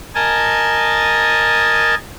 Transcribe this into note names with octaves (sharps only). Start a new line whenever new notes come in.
A#4 D#5 G#5 A5